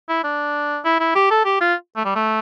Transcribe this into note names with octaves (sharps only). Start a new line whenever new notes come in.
E4
D4
E4
E4
G4
A4
G4
F4
A3
G3
A3